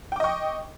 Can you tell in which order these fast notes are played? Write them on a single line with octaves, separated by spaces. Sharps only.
G5 D6 D#5 C#6